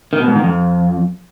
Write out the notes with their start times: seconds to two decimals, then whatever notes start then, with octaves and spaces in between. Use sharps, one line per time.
0.13 D#3
0.20 B2
0.28 G#2
0.36 D#3
0.43 F2